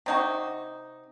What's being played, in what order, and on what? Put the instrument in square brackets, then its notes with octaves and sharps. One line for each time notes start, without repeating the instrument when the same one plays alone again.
[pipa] C3 D#4 F#4